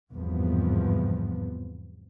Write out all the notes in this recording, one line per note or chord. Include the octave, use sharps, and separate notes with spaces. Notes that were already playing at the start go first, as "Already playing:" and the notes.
G#1 E2 G2 C3 F3 B3